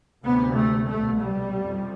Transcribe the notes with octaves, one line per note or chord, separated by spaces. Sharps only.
D2 C3 B3
A3
C2 B2 A3
G3
F2 C3